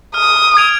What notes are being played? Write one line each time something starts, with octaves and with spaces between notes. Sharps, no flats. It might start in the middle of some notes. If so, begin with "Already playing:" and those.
D#6 F6
G#6 D7 F7